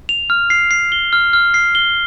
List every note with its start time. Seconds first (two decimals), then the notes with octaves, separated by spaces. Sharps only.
0.09 F7
0.30 F6
0.50 C7
0.71 C7
0.92 G7
1.13 F6
1.33 F6
1.54 C7
1.75 G7